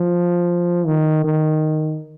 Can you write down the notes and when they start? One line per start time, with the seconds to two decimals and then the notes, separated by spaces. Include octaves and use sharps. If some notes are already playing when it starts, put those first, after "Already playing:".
Already playing: F3
0.87 D#3
1.24 D#3